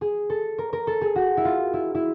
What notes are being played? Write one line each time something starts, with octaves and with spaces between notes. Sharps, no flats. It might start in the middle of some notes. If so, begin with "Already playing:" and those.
G#4
A4
A#4
A#4
A4
G#4
F#4
E4
F4
E4
E4